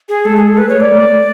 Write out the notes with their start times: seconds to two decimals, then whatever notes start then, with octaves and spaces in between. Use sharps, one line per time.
0.09 G#4
0.25 G#3 A4
0.36 G#4
0.47 A4
0.58 A3 B4
0.69 C#5
0.80 D5
0.92 A3